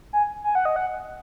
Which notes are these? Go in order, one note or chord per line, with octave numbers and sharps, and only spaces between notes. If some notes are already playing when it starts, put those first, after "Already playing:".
G#5
G#5
F#5
D#5
F#5